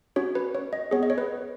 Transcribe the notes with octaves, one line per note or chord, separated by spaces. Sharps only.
C#4 F#4 C#5
B4
C#5
D#5
B3 G#4 C#5
D#5
C#5
B4